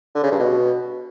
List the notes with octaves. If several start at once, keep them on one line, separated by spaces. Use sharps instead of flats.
D3
C#3
G2
B2